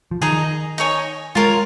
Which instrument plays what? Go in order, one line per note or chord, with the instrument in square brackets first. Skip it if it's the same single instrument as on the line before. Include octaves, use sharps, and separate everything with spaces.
[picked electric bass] F3
[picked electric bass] D#3 [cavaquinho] D#4 G#4 D#5 A#5
[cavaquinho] D#4 C#5 G#5
[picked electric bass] G#3 [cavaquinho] F4 A#4 C#5